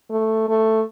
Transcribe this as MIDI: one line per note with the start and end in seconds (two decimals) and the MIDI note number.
0.10 0.47 57
0.48 0.83 57